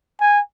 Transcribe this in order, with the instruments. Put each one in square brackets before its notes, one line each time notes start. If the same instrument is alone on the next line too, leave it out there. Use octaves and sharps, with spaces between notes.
[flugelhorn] G#5